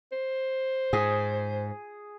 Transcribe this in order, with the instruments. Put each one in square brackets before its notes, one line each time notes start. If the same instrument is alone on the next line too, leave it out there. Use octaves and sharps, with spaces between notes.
[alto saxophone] C5
[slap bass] G#2 [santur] G#4